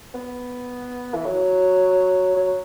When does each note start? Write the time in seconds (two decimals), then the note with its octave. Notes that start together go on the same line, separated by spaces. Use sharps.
0.15 B3
1.14 E3
1.26 F#3
2.36 F#3